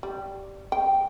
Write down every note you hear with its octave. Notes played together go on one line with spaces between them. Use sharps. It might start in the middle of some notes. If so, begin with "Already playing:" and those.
G3
G5